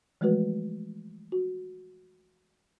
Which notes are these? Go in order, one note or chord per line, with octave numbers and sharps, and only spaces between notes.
E3 F3 G#3 A3 F#4 B4
F#4